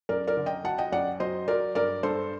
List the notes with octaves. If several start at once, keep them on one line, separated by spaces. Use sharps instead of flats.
F#2 A#4 D5
A#4 D5
D3
D#5 G5
F#3 F#5 A5
D#5 G5
F#2 D5 F#5
F#3 C5 D#5
F#3 A#4 D5
G2 A#4 D5
G2 A4 C5